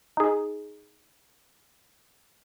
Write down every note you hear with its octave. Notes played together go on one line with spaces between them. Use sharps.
D#4 G#4